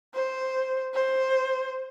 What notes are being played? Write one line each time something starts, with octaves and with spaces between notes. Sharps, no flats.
C5
C5